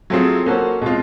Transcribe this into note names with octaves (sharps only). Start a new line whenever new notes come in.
F#3 A3 C4 F4 G#4
A#3 C#4 F#4 A4 C5
B2 G#3 C4 F4